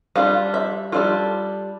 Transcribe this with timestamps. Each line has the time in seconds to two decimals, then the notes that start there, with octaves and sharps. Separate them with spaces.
0.15 G3 D4 F4 F5
0.54 E5
0.92 G3 D4 F4 A4